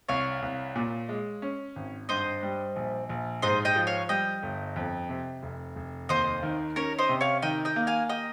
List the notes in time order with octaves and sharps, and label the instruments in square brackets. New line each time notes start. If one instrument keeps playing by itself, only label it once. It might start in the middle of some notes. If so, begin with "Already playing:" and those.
[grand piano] C2 [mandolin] C#5 F5
[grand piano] C2
A#2
G#3
C#4
G#1
[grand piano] G2 [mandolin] C5 D#5
[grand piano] G3
A#1
A#1
[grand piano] G#2 [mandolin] C5 D#5
[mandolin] D#5 G5
[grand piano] F3
[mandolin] C#5 F5
[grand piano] G3 [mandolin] D#5 G5
[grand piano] G1
F2
C3
F1
F1
[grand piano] D#2 [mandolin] C5 D#5
[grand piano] D#3
[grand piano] C#4 [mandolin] A#4 C#5
[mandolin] C5 D#5
[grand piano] C3
[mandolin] C#5 F5
[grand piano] D#3 [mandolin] D#5 G5
[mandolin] D#5 G5
[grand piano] A#3
[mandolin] F5 G#5
D#5 G5